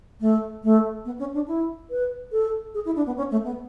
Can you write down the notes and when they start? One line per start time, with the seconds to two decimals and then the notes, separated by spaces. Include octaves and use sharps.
0.21 A3
0.64 A3
1.05 B3
1.19 C#4
1.34 D4
1.48 E4
1.91 B4
2.32 A4
2.74 G#4
2.85 E4
2.96 D4
3.06 B3
3.17 C#4
3.31 A3
3.44 B3